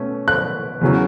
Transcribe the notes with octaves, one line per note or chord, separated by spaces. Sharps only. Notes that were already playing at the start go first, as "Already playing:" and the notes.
Already playing: B2 A3 C#4
F#6
E2 C#3 F#3